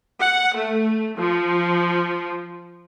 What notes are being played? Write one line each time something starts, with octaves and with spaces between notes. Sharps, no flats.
F#5
A3
F3